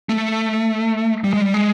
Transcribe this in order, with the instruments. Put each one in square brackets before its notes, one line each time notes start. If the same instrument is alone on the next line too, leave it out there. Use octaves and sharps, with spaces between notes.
[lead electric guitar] A3
G3
G#3
G3
G#3